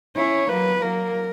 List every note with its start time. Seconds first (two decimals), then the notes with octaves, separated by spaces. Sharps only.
0.16 C#4 E4 C#5
0.49 F#3 A#3 B4
0.81 F#3 A#3 A#4